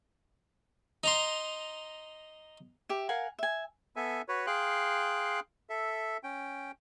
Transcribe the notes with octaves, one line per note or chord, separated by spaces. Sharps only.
D#4 A#5 C6
G4 E5
A#4 F5 F#5 G#5
E5 G#5
B3 A4 E5 G#5
F#4 B4 C#5
G#4 F5 G5 C6 F#6
A4 E5
C#4 G5